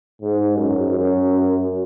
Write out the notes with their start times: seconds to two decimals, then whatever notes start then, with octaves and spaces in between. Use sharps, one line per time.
0.22 G#2
0.56 F#2
0.91 F#2